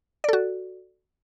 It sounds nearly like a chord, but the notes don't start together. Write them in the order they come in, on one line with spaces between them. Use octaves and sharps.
D5 A4 F#4